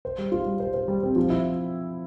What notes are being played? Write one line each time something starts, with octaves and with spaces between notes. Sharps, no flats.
C5
G3
F4
G3
C5
C5
G3
C4
F3
E4